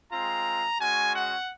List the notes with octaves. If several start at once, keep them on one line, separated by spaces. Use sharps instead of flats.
G#3 C4 F4 A#5
G#3 C#4 F#4 G#5
F#5